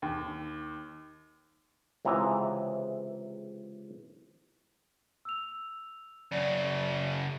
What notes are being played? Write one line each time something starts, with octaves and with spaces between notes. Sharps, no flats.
D#2
C#2 C3 E3 G#4 A#5
E6 F7
F#2 C#3 D5